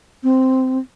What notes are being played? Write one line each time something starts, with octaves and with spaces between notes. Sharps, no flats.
C4